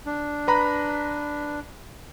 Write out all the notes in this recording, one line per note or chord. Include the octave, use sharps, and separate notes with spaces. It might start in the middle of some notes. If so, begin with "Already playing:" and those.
D4
B4 A#5 B5